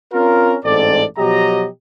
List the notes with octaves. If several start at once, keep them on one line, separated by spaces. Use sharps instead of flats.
C4 C#4 F4 A#4
A1 G#2 C4 A4 D5
B2 F3 F#3 G4 D#5 A#5